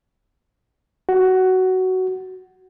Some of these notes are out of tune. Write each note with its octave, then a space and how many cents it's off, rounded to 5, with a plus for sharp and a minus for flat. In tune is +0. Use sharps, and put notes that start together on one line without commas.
F#4 +10